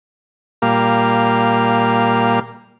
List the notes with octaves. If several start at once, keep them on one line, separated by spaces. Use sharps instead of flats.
A#2 G3 A#3 F5